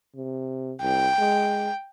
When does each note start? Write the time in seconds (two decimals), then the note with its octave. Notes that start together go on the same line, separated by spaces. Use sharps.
0.16 C3
0.82 C2 G5
1.19 G#3